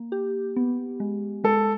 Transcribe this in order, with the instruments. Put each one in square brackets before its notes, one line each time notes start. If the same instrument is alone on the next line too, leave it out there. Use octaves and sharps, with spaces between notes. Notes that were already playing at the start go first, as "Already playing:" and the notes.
Already playing: [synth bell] A#3
G4
B3
G#3
[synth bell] G#3 [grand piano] A4